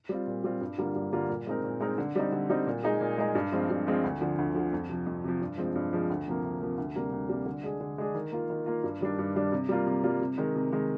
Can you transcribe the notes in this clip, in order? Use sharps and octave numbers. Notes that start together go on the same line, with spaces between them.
G3 C4 F4
A#2
G3 C4 F4
G2
D3 G3 A#3 F4
G2
D3 G3 A#3 F4
A#2
G#3 C4 D#4 A#4
A#2
G#3 C4 D#4 A#4
D3
G3 C4 D#4
D3
G3 C4 D#4
A#2
G#3 D#4 G#4
A#2
G#3 D#4 G#4
G2
F3 G#3 C4 F4
G2
F3 G#3 C4 F4
D2
D3 F3
D2
D3 F3
F2
C3 F3
F2
C3 F3
G2
F3 G#3 C4
G2
F3 G#3 C4
D2
C3 F3 A#3
D2
C3 F3 A#3
D2
C3 G3 A#3
D2
C3 G3 A#3
D3
G#3 D4 G#4
D3
G#3 D4 G#4
D#3
A#3 F4
D#3
A#3 F4
G2
D#3 G3 D4
G2
D#3 G3 D4
C3
G3 A#3 F4
C3
G3 A#3 F4
C3
D#3 G#3
C3
D#3 G#3